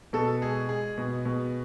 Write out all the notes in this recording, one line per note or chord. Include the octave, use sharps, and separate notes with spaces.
B2 A4
G#3 G#4
G#3 G#4
B2
B2